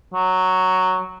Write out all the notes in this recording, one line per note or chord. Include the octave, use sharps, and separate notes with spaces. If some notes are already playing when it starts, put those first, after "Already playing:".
F#3